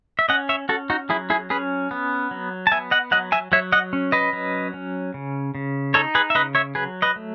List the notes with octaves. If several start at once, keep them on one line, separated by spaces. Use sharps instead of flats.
E5
C#4 D#5 F#5
C#5 E5
C#4 F#4 A4
D#4 F#4
F#3 E4 G#4
E4 G#4
C#4 G#4 B4
B3
F#3
A5
B3 E5 G#5
D#5 F#5
F#3 D#5 F#5
E5 G#5
F#3 C#5 E5
D#5 F#5
C#4
B4 D#5
F#3
C#4
C#3
C#3
D#4 A4 C#5
G#4 B4
E5
C#3 B4 D#5
C#5 E5
F#3 G#4 B4
B4 D#5
A3